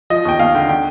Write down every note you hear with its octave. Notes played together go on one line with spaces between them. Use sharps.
F3 D#5
D#2 G5
D#2 F5
D3 G5
D3 G5